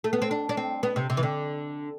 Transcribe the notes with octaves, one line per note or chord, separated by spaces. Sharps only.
A3
B3
C4
D4
D4
C4
B3
C3
C3
E3
D3